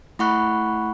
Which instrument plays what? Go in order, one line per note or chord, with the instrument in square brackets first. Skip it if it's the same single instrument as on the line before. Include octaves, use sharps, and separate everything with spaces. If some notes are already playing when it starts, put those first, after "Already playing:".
[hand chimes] A3 E4 F#5 B5 C#6 F#6